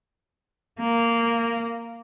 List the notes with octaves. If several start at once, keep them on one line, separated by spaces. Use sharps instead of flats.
A#3